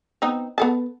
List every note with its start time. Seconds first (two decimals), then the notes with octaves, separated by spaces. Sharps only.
0.22 B3 C4 D#4
0.58 B3 A4 A5